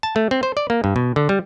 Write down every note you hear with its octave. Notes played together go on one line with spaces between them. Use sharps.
A5
A3
C4
C5
D5
A#3
G2
B2
D3
G3